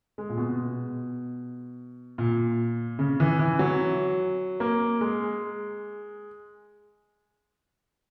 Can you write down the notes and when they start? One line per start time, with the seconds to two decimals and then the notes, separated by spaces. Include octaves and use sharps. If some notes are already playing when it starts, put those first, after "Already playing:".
0.18 G#3
0.29 A#2
0.37 B2
2.18 A#2
2.99 C#3
3.20 E3
3.39 E3
3.59 F#3
4.60 A#3
5.01 G#3